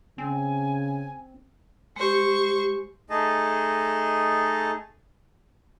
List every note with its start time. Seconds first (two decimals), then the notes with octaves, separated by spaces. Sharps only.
0.18 C#3 C4 G#5
1.96 G#3 G4 C5 C#6
3.10 A3 D#4 G#4 D#5 A5